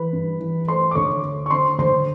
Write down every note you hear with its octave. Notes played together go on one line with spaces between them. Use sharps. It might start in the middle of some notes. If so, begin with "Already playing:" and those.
Already playing: E3 B4 B5
G2
E3
A3 C5 C6
D6
D2 C#5 C#6
A3
C#6
D3 C5 C6
D2 C5 C6